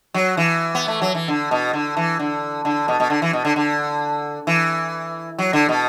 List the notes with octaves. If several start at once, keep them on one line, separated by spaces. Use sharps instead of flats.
F#3
E3
B3
A3
F#3
E3
D3
B2
D3
E3
D3
D3
B2
B2
D3
E3
B2
D3
D3
E3
F#3
D3
B2